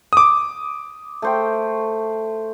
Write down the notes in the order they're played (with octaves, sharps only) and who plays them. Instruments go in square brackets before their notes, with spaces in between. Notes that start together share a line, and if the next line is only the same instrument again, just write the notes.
[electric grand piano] D6 D#6
[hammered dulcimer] A3 C5 G5